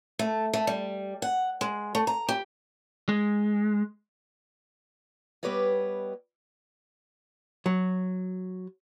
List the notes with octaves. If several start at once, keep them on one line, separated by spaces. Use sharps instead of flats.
A3
A3
G3
F#5
G#3
A3
A#5
G4
G#3
G3 B3 G4 B4 C#5 D#5
F#3